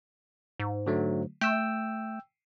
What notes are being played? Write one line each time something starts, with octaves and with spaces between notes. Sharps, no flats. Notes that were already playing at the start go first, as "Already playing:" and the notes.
G#2
D3 F#3 A3
A3 G5 E6